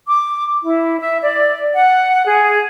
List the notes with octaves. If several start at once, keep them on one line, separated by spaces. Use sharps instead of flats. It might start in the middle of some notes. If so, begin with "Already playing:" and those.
D6
E4
E5
D5
F#5
G#4